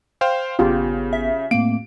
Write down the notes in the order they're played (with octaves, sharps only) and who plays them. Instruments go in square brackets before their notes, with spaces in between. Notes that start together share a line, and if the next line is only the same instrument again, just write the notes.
[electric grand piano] C5 F5 G5
[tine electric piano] G#1 B3 [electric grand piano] C#3 [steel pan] F4 G4
[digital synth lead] E5
[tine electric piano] A2 A3 C4 [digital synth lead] A#3 [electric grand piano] D7